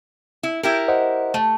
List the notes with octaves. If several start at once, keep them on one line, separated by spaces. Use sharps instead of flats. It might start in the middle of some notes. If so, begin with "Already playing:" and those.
E4
E4 G4 A#4
C5 D#5 F#5
A3